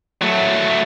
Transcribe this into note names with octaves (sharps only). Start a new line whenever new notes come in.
F#3 A3